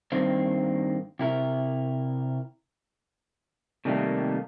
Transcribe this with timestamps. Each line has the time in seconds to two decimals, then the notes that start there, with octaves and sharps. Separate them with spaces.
0.12 G2 D#3 A#3 C4
1.19 C3 E4 A#4
3.85 C3 D#3 G3 A3 A#3